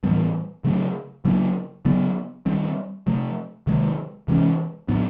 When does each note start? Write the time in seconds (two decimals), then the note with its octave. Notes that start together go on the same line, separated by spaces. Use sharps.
0.04 A2 E3 G3 B3
0.64 C#3 F#3 A3 D4
1.25 C#3 F#3 A#3 D4
1.85 C#3 F#3 B3
2.46 D#3 G3 C4
3.07 C3 F3 A3
3.67 C3 D#3 G#3
4.28 C3 E3 G#3 C#4
4.88 A2 F#3 B3 D4